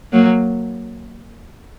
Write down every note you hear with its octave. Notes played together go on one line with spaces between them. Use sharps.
F#3 A#3